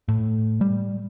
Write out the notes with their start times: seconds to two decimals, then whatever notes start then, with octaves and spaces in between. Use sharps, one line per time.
0.08 A2
0.61 G3